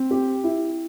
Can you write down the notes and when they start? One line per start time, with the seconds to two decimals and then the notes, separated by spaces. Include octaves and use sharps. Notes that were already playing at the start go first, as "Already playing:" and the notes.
Already playing: C4
0.11 G4
0.44 E4